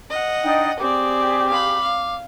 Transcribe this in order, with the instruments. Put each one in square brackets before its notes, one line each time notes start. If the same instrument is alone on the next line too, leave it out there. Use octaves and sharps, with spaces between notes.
[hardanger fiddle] D#5 F#5
[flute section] D4 D#4 G5
[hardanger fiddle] C4 D5 [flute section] G4 G#4 [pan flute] D6
[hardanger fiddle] F5 B5
F5